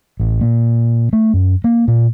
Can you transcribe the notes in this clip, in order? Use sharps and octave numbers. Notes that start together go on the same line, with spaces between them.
A1
A#2
A3
F#2
A#3
A#2